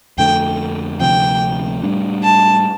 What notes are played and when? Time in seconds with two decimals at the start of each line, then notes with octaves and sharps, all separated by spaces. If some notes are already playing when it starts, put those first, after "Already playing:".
0.18 F2 D3 A3 G5
1.00 D2 C3 F3 C4 G5
1.83 A2 G3 D4
2.24 A5